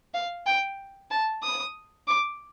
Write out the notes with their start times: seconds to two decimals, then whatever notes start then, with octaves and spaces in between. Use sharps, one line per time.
0.14 F5
0.46 G5
1.11 A5
1.43 D#6
2.08 D6